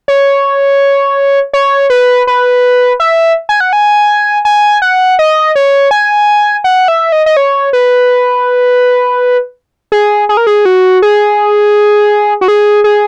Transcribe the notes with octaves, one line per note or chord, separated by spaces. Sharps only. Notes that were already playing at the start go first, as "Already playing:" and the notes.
C#5
C#5
B4
B4
E5
G#5
F#5
G#5
G#5
F#5
D#5
C#5
G#5
F#5
E5
D#5
D#5
C#5
B4
G#4
G#4
A#4
G#4
F#4
G#4
F#4
G#4
G#4